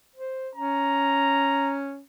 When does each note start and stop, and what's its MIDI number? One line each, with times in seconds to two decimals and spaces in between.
0.16 0.49 72
0.55 2.01 61
0.55 1.75 82